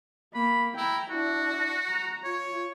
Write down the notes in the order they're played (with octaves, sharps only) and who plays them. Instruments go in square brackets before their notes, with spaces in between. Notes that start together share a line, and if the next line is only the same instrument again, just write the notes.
[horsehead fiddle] A#3 [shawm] B5
[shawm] E4 [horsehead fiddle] G5 A#5
[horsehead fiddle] D4 E4 [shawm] F#4
[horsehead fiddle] A#5
[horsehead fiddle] F4 [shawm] C#5